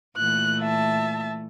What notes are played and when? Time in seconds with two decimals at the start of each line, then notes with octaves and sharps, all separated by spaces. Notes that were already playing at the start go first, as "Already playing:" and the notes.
0.17 A#2 E3 A3 F#6
0.60 E5 A5